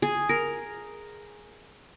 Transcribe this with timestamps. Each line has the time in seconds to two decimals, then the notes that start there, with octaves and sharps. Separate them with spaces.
0.02 G#4
0.29 A#4